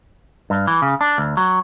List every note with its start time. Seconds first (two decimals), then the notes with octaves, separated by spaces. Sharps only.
0.50 G2
0.67 E3
0.82 C#3
1.01 D4
1.18 D2
1.37 F#3